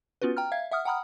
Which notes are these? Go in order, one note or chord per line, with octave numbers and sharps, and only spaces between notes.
B3 C#4 F4 F#4 B4
G5 A#5 F6
E5 F5 G#6
E5 F#5 D#6 F6
F#5 G5 A#5 B5 D#6 F6